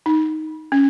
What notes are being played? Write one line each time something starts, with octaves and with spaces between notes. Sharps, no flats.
D#4
C#4